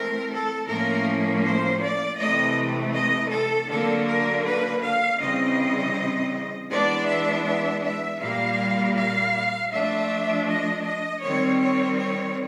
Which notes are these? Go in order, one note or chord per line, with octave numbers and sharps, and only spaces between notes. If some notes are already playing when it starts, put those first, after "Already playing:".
Already playing: E3 A3 C4 A#4
A4
A2 F3 A#3 C#4 A#4
C5
D5
C3 E3 A3 D#5
D#5
A4
D3 F#3 A#3 D4 A4
A#4
B4
F5
C#3 E3 G3 C4 D#5
E3 G#3 B3 D4 D5
E5
E5
E5
A#2 G3 A#3 F5
F5
F3 A3 D4 E5
D#5
D#5
D#3 G3 C4 C#5
C#5
C#5